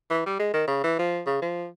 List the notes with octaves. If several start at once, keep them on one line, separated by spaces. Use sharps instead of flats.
E3
G3
G#3
D#3
C#3
E3
F3
C#3
F3